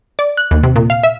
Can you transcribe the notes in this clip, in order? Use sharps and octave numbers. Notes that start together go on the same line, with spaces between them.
D5
F#6
D#2
C3
A#2
F5
E5